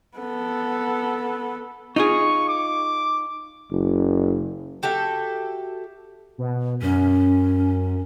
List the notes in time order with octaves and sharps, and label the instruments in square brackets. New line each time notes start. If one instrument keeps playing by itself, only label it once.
[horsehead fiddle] B3 A4
[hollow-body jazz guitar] D#4 F4 G#4 [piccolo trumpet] C#6
[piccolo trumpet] D6
[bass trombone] F#1
[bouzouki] F#4 G4 A4 E5
[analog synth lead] B2
[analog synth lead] F#2 [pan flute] C#4